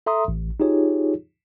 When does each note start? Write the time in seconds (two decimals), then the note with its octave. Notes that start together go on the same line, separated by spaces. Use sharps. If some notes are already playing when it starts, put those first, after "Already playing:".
0.06 A4 E5 A#5 C6 D#6
0.28 A1
0.60 D#4 F4 G4 G#4 C#5